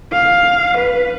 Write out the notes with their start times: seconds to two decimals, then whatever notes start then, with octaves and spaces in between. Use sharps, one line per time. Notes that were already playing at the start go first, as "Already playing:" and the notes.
0.12 F5
0.77 B4